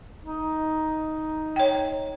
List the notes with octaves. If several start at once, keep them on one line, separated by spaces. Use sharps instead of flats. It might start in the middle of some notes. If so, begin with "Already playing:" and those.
D#4
C#5 G5